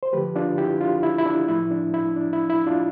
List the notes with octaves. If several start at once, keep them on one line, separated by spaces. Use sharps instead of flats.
C5
D3 F3 A3 G4 B4
D4 F4
E4 G4
D4 F4
E4
E4
D4
A2 F3 A3 E4
D4
E4
D4
E4
E4
D4 F4